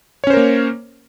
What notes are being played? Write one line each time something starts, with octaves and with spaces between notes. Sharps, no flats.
A#3 C#4 A#4 C5 C#5